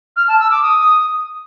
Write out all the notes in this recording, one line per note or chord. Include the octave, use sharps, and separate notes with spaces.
F6
A5
E6
D6
D#6